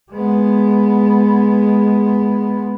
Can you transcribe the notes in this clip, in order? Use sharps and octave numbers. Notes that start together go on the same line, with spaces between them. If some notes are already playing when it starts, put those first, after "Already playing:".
G#3 B3